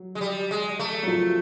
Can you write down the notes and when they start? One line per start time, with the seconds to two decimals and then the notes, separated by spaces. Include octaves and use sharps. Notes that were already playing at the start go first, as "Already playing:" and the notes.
Already playing: F#3
0.15 G#3
0.21 G3
0.51 G#3
0.79 A3
1.03 F#3
1.08 F3